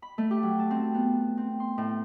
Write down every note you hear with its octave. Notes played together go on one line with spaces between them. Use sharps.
B5
A3
G4
F#3
A5
C4
B3
C4
C6
A2